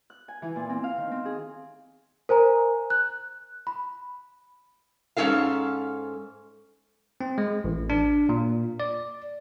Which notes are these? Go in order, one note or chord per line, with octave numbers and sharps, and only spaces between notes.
F#6
G#5
E3
A#2
C4
F5
D#3
C4
G#4
A#4 C5 G#5 A#5
F#6
B5
G#2 F#3 C#4 A4 F5
C4
G#3
A1
D4
A#2
D5